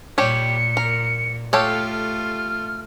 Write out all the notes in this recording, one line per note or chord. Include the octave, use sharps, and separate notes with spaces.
A#2 G3 G4 C#5 C#7
A#4
A3 F4 G4 A4 C#5 F5
F6